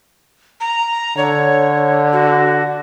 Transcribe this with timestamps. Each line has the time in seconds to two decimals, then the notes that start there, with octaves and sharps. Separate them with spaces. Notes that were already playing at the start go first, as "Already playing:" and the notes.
0.60 A#5
1.17 D3 C#5
2.13 F#4